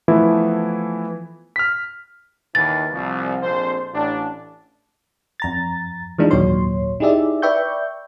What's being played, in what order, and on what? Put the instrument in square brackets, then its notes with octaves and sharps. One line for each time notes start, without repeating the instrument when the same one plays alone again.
[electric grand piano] E3 F3 A3 B3 E4
F6 B6
[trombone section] D#2 D#3 E3 [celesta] A6
[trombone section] C2 F3
A#1 F2 C5
A1 D4
[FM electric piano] F2 A#5 A6
E3 G#3 D4 D#4 F4
G#1 D#2 A#2 F#3 C#5 C6
D#4 E4 G4 G#4 D5 E5
B4 D5 E5 G5 C#6 G6